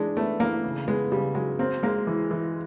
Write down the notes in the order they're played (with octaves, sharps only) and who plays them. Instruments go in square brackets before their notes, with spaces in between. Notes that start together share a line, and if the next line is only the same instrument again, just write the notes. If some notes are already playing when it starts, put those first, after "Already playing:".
Already playing: [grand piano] E3 D4 [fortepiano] G#3
[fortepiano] A3 [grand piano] B3
[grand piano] E3 [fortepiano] A#3
[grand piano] C#3
[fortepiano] G#3 [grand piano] B3
[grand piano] C#3 [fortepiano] G3
[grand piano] F#3 [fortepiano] G#3
[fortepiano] A#3 [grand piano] C4
[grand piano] G#3 [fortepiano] A#3
[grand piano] E3
E3